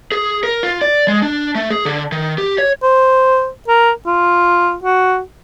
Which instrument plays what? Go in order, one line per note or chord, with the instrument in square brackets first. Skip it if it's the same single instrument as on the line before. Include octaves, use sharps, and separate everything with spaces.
[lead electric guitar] G#4
A#4
F4
D5
G#3
D4
A3
G#4
D3
D#3
G4
C#5
[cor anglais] C5
A#4
F4
F#4